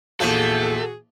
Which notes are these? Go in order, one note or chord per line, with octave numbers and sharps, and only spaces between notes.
A#1 E2 C3 F3 A3 F#4 G#4 A4